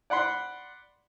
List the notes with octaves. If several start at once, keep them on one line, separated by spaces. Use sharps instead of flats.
D5 F#5 B5 C6